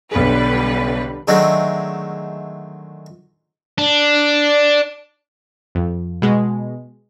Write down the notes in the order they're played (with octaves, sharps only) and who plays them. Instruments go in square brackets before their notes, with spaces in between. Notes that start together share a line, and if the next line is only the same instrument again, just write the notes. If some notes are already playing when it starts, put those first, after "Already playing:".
[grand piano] B1 G#4 [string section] D3 G3 B4
[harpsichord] D3 D#3 F#3 G#3 A3 C4
[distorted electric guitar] D4
[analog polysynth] F2
B2 G#3